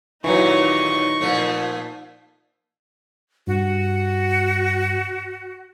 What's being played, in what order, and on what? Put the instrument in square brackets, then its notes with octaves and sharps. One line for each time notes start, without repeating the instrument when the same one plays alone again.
[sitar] D#2 A#2 D#3 [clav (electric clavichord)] E3 F#3 [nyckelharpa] D#4 C#6
[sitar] A#2 F3 A3
[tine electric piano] G2 [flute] F#4